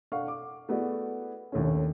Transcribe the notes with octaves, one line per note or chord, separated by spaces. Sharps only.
D4 A4 F5 F#5 C#6
D6
A3 B3 E4 F#4 G#4 D5
A#1 D#2 A3 C#4